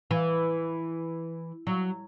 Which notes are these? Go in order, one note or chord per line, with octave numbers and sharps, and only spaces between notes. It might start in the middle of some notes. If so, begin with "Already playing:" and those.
E3
F#3